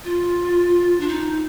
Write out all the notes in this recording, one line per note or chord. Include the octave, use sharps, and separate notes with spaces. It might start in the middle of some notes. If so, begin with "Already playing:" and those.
F4
D4
D#4